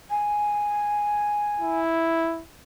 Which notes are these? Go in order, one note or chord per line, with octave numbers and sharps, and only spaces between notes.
G#5
E4